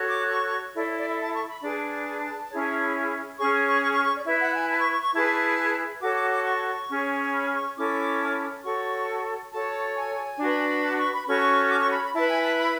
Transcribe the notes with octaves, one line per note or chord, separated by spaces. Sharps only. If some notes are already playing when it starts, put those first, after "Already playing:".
Already playing: F#4 A4 C#5
D6
C#6
C#6
E4 A4 C#5 D5
C#5
D5
E5
A5
C#6
B5
D4 G#4 B4 A5
C#4 E4 G#4 C#5
C#4 G#4 C#5 C#6
C#6
C#6
C#6
C#6
D5
E4 B4 E5
F#5
G#5
A5
C#6
C#6
C#6
E4 G#4 B4 A5
F#4 A4 C#5 D6
D6
D6
C#6
C#4 G#4 C#5
B5
C#6
C#4 E4 A4 C#5 D6
F#4 A4 C#5 C#6
F#4 A4 C#5 A5
G#5
D4 F#4 B4
A5
C#6
B5
C#4 F#4 A4 C#5 C#6
D6
C#6
B5
B5
E4 B4 A5
G#5
A5
B5